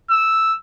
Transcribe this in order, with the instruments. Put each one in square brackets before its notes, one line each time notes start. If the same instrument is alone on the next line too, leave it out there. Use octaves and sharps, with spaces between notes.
[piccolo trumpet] E6